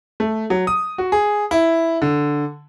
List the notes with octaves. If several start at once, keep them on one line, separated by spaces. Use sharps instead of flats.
A3
F#3
D#6
F#4
G#4
E4
D3